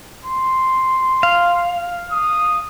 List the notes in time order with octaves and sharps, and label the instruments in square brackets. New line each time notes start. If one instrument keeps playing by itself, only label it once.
[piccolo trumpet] C6
[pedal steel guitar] F5
[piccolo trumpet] D#6